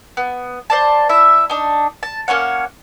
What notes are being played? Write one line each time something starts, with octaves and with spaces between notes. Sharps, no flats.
B3
C5 D5 A5
E4 E5
D4 D#4
A5
A#3 C#4 C#5 F#5